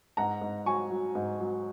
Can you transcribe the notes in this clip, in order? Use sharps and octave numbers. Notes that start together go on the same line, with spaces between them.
G#2 F#5 A#5
G#2
F#3 G#5 C#6
F#3
G#2
F#3